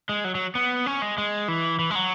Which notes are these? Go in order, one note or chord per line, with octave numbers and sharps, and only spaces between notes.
G#3
F#3
F#3
B3
C#4
G#3
G#3
E3
E3
G#3
F#3